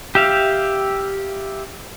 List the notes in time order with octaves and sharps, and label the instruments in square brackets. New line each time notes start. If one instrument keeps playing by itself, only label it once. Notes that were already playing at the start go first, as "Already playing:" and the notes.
[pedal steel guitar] G4 E5 F5